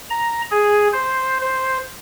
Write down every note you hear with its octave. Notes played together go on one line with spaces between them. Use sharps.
A#5
G#4
C5
C5